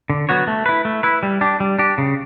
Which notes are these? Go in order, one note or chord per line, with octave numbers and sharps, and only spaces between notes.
D3
F#3 B3 F#4 C#5
A3
E4 B4
A3
E4 B4
G3
D4 G4
G3
D4 G4
C#3